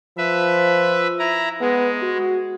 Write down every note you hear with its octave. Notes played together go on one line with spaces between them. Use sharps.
F3 B4 E5
E4 A#5
G#3 B3
F#4